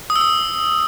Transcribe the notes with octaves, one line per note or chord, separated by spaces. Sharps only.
D#6
E6
D#6